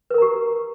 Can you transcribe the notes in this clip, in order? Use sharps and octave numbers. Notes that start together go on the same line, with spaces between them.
G4 A#4 B4 A#5